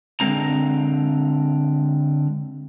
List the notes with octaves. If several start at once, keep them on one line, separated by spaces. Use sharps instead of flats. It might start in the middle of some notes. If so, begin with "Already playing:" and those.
D3 G#3 C4 A#5